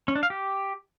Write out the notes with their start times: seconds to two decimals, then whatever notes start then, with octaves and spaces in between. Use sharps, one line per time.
0.08 C#4
0.15 D4
0.23 F5
0.30 G4